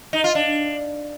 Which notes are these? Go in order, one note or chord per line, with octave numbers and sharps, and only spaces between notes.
D#4
F4
D4